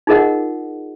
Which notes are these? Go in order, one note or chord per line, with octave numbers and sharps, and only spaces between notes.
D#4 F4 G#4 A#4 D#5 F#5